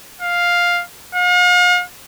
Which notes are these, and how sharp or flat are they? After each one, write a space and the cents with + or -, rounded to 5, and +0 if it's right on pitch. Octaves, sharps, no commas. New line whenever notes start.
F5 +5
F5 +45